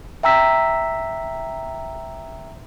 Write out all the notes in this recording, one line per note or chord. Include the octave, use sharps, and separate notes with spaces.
E5 G5 A#5 E6 B6